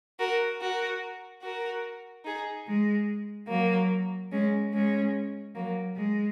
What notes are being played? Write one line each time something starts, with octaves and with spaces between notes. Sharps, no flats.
F#4 A#4
F#4 A#4
F#4 A#4
D#4 G#4
G#3
F#3 A#3
G#3 C#4
G#3 C#4
F#3 A#3
G#3